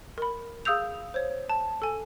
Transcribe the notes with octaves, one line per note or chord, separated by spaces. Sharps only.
A#4 B5
G#4 F5 D#6 E6 G6 F7
C5 C#5
A5
A4 G#5